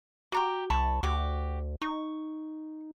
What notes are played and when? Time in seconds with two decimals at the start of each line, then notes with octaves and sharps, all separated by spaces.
0.32 F#4 G4 A#5 D6
0.70 C2 A5 B5 C#6
1.03 D2 F#4 G4 D6
1.82 D#4 C#6